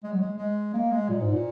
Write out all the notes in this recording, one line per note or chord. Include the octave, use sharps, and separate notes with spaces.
G#3
F#3
G#3
G#3
A#3
G#3
A#2
G#2
A#2